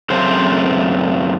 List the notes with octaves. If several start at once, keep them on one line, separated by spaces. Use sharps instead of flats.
F#2 C#3 A3 C4 C5